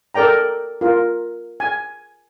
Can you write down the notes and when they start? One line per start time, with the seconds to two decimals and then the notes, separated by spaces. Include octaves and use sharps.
0.14 A4 A#4 D5 G5 A#5
0.81 F4 A#4
1.60 G#5